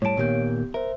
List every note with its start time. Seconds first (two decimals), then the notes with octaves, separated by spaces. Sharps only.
0.02 A2 G3 C#5 A5 D7
0.17 A#2 D#3 A#3 B3 G4 G6
0.74 A#4 C5 E5